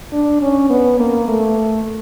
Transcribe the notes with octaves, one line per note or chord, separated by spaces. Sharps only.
D4
C#4
B3
A#3
A3